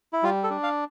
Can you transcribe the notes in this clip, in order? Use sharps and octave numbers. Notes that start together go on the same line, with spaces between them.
E4
G3 F4
A4
D4
F5